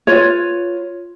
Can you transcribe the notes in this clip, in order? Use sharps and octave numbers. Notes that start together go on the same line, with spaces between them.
F4 B4 C#5